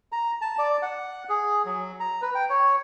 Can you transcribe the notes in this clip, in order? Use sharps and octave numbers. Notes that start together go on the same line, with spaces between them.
A#5
A5
D5
F#5
G#4
F#3
A#5
B4
G5
C#5